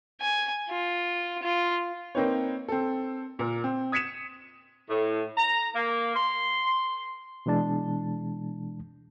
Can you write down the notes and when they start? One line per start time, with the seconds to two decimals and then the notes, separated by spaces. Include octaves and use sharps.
0.21 G#5
0.69 F4
1.43 F4
2.15 A#3 C4 D#4 B4 C#5
2.68 C4 A4
3.39 A#2 A#4
3.64 C4
3.92 D#6 G#6 B6 C#7 D#7 E7
4.89 A2
5.37 A#5
5.74 A#3
6.15 C6
7.46 B2 E3 G#3 D4 A5